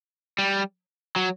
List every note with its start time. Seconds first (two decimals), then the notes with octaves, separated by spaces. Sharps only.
0.39 G3
1.16 F#3